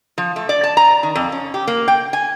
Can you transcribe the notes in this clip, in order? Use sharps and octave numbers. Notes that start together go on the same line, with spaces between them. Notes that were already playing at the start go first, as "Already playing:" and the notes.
F3
A3
D5
A5
A#5
D#3
F2
C#4
G4
A#3
G5
G#5